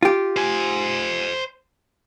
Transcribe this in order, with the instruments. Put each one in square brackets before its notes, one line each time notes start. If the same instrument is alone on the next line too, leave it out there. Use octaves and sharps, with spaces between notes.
[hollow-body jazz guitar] F4 G4
[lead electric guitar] C5 G#5